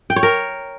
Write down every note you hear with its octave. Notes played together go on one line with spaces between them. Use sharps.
G5
C#5
A#4